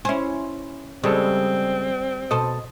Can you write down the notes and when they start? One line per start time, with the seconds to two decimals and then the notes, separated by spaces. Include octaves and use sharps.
0.05 C#4 E4 C5 G#5
1.04 C#3 G3 G#3 C4 A4
2.31 B2 A4 C5 D#5